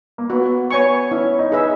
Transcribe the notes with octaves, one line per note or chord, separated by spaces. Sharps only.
A#3
B3 F#4
B3 C#5 G#5 C#6
C#4 E4
D#4
G#4 B4 E5